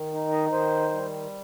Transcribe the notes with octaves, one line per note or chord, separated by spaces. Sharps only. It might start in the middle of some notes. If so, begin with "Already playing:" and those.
Already playing: D#3
D#4
D#5
D#3 C5
G3